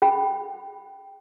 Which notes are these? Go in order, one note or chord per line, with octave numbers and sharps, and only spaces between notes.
G#4 G5 B5